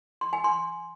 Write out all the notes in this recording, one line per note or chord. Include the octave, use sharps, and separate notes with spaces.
C6
G#5
C6